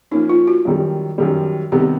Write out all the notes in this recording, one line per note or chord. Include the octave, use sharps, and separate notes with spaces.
F3 A#3 C#4 D#4
F4
F#4
F#2 D#3 G3
F#2 D#3 G3
C3 D#3 G3 B3 G4